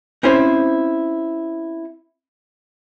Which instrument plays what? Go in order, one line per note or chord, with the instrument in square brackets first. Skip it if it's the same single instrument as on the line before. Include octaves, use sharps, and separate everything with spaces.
[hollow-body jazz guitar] C4 C#4 E4 C5